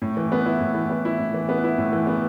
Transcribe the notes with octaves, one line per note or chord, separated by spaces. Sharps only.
A2
E3
B3
E4
A2
E3
B3
E4
A2
E3
B3
E4
A2
E3
B3